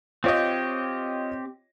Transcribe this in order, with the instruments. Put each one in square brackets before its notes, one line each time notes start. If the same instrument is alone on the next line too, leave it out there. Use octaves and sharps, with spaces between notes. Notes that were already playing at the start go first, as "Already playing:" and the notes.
[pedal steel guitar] C4 G4 [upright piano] F4 C#5 D#5